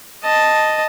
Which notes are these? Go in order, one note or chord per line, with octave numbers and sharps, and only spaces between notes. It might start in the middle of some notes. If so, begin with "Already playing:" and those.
D#5 A5